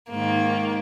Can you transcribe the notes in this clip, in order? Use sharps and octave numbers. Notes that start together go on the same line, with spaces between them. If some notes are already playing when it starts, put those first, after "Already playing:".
G#2 D#3 A#3